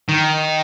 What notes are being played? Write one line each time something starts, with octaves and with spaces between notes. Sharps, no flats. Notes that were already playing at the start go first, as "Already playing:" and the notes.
D#3